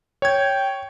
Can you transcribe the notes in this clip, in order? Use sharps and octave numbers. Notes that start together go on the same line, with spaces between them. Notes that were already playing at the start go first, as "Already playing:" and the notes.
C#5 G5 G#6